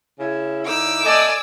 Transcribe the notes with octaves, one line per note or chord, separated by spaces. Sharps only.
C#3 E4
D3 D#4 E4 D6 E6
A3 D5 D#5 G#5